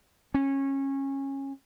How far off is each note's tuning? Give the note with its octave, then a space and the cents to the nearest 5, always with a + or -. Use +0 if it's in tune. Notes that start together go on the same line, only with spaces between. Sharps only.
C#4 -20